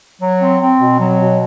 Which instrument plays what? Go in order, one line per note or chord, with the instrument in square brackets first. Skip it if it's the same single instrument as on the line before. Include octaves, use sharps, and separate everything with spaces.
[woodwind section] F#3
C4
C4
B2
F#3
B2